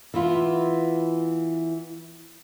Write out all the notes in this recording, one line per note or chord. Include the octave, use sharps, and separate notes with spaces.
E3 B3 F4